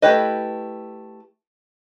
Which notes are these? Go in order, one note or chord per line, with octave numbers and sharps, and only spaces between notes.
A3 E4 G4 B4 D#5